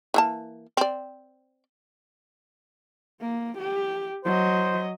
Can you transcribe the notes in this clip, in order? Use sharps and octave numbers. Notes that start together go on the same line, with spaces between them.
E3 A#3 A5
C4 D5
A#3
G4
F#3 C5 D#5